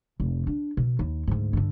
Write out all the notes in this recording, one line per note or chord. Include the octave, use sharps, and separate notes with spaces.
F1
D4
B2
D#2
D2 G#2
G2 D3